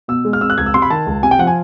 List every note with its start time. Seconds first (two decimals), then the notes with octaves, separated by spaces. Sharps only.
0.08 B2 E6
0.25 G#3
0.33 F6
0.41 C4 E6
0.50 F#6
0.58 C#2 G#6
0.66 E6
0.74 C3 C6
0.82 B5
0.90 D#3 A5
1.07 C#2
1.23 C3 G#5
1.31 G5
1.39 F3 F#5
1.47 G#5